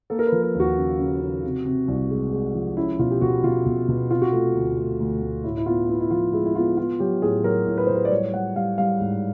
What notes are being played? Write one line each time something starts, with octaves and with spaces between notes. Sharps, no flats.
A#3 A4
A#4
B4
F3
A#4
D#2
F#4
C#3
C#3
C#3
C3
C3
C2
G#3
G#3
F3
C#4 E4
B2 F4
G4
B2 F#4
B2 F4
B2
B2
C3 F4
F#4
A3 F4
D2
A3
D2
D2
A2 E4
E4
B3 F4
B3 E4
E4
F3 F4
G#3 E4
E4
B3 F4
B3 F4
F#3 G4
A2 G#4
F#3 A#4
A2
B4
F#3 C5
B4
D5
G3 C#5
G3 F#5
G3 F5
G3 F5
G#2